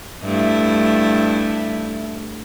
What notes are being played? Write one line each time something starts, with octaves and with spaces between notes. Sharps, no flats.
G2 A3 E4